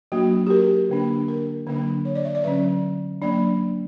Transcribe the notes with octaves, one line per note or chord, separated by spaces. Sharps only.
F#3 A#3 D4 F#4
G4
A#4
D3 A#3 D4
A#4
D3 F#3 A#3 D4
C#5
D5
E5
D5
D3 F#3 C#4 E5
F#3 A#3 D4 D5